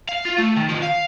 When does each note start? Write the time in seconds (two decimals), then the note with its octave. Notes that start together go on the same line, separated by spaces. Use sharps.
0.09 F5
0.25 F4
0.38 A3
0.56 D#3
0.69 D#3 F3
0.82 F5